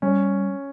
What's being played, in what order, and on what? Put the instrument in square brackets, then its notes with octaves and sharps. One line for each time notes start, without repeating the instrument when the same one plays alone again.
[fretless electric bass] G3 [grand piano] C#4